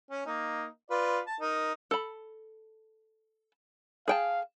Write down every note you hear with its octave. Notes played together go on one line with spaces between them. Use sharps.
C#4
A#3 D#4
F4 B4 D5
A5
D#4 A#4
A4 B5
G#4 F5 G5 A5